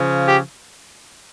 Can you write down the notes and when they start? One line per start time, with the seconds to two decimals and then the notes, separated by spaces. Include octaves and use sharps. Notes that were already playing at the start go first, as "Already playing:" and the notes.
Already playing: C#3 F3
0.27 G4